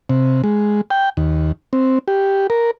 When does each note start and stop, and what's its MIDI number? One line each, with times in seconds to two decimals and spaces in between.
0.10 0.42 48
0.44 0.81 56
0.91 1.09 79
1.17 1.52 39
1.73 1.99 60
2.08 2.47 67
2.50 2.71 70